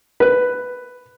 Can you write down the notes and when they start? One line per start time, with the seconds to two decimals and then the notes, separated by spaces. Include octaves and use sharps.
0.20 B4